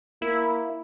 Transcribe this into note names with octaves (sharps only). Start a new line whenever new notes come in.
A#3 E4